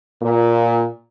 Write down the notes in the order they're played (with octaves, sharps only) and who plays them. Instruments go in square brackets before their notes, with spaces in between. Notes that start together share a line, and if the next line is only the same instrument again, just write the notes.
[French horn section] A#2